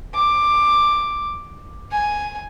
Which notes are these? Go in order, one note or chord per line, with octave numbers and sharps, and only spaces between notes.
D6
G#5